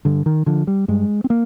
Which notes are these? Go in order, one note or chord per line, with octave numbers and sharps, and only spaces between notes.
G2 D3
D#3
D3 F3
G3
G2 G#3
C4
A#3